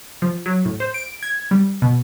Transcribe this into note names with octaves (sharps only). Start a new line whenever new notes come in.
F3
F#3
A2
C5
D7
G#6
G3
B2